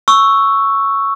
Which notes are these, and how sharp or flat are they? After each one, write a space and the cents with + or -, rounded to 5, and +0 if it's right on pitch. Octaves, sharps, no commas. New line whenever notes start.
C#6 +0 E6 +0